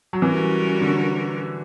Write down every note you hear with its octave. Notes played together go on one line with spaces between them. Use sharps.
F#3
E3 G3 C#4 F#4 A#4
D3